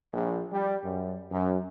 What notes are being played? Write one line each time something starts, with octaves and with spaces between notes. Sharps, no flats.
A#1
G3
F#2
F#2